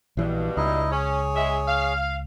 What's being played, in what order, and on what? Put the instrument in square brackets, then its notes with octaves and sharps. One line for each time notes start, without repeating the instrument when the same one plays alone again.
[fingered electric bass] A#1 E3 [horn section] G2 B2
[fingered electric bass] C#2 [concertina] D#4 E4 D#5
[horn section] C#4 [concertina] G#4 C#5
[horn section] G#3 E5
F5